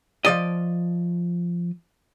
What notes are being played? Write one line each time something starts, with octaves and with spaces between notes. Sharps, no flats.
F3 D5 D#5